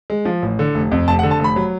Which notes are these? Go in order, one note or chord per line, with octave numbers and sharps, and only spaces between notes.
G#3
F3
A1
D3
F1
F2
F1 A5
F#5
D3
A5
F1
B5
F#3